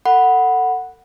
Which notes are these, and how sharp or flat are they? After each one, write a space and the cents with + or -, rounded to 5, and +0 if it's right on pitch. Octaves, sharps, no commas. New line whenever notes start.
A4 +40 F#5 +0 B5 +0